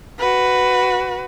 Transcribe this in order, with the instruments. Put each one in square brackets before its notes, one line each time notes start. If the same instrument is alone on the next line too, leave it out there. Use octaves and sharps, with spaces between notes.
[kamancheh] F#4 B4